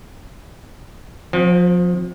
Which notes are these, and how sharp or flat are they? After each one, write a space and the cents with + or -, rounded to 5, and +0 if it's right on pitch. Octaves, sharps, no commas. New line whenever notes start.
F3 +35 C4 -5